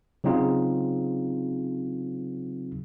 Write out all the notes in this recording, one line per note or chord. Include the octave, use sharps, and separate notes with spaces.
C#3 F#3 C4 D#4 F4 G#4